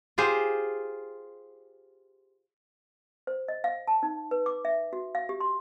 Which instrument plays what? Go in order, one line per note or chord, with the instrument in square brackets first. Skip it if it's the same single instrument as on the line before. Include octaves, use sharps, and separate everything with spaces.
[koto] F4 G4 G#4 C5
[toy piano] C5
D#5
F5
A5
D#4
B4
D6
E5
F#4
F5
G4
C6